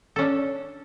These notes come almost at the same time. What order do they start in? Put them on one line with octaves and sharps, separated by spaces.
A4 C#4 D4